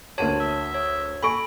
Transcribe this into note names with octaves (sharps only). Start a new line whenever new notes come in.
D2 C3 A#4 C#5 A5 D#7
E5
C#5
A4 G#5 B5 C#6 D7